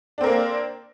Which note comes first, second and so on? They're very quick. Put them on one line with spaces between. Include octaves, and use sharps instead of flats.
D4 C4 A#4 A#3